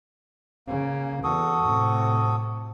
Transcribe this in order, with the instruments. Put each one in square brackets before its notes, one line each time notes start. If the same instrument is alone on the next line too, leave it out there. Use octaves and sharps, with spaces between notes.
[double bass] C#3 [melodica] A#3
[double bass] E2 [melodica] F#4 A4 D#6
[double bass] A2 C3